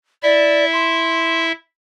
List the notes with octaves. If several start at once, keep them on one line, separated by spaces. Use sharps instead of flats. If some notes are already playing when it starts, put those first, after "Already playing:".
E4 D5 E5
C6